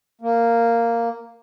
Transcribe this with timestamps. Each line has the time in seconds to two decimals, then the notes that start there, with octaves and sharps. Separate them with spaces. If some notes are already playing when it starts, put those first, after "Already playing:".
0.21 A#3